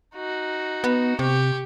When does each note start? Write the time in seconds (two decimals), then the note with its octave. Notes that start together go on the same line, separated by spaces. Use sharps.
0.15 D#4 F#4
0.84 B3
1.19 C3 G4 C#6